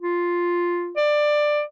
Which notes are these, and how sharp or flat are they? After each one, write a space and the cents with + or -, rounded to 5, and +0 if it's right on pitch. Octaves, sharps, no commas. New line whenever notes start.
F4 +0
D5 +15